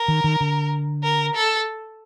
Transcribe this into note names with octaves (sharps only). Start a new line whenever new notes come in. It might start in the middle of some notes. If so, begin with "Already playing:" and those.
Already playing: A#4
D#3
D#3
D3
A#4
A4